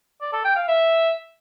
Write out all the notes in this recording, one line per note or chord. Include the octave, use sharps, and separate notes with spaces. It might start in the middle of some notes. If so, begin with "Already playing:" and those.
D5
A4
G5
F5
E5